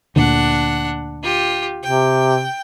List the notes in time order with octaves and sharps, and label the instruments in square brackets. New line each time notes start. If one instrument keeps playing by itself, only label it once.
[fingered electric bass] D2 A#2 D3 [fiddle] D4 F#5
[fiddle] F4 G4
[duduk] C3 [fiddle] G5